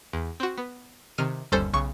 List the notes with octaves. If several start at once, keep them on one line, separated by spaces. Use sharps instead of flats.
E2
C4 F#4
B3
C3 D#3 F6 D#7
G1 D#2 G3 C#4 A4 C5
B1 C#3 C#6